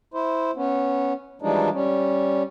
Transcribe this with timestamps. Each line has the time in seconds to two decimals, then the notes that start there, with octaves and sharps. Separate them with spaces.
0.14 E4 C5
0.56 B3 C#4
1.42 E3 F3 G3 G#3 D4 D#4
1.73 G3 C#4